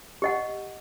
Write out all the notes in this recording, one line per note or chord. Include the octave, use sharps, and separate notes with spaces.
G4 D#5 F#5